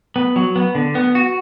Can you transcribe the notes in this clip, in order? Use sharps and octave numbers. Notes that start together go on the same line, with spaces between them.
B3
F#3
B3
D3
B3
F#4